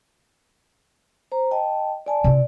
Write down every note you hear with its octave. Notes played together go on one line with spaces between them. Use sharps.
C5 A#5
D#5 G5 A5
D5 G#5 A5
C3 E4 D5